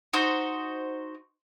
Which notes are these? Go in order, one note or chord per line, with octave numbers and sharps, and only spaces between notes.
D#4 F#4 C5